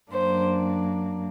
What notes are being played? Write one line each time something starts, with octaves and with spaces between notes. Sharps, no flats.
F#2 F#3 A#3 D4 C5